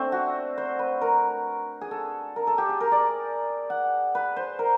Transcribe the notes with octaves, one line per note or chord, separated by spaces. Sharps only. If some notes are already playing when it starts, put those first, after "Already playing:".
Already playing: A3 C4 D4
F#4
C5
B4
A#4
G#4
A4
A#4
A4
G4
G#4
A#4
D5
F#5
B4
C5
A#4